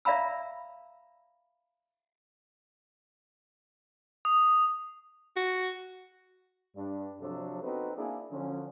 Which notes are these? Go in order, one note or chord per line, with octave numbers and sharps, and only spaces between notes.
D5 E5 F5 A#5 B5 E6
D#6
F#4
G2 D4
C3 F3 F#3 D4 A4
B3 C4 D#4 F#4 A4 B4
A#3 D4 E4 G#4
D3 F3 F#3 C#4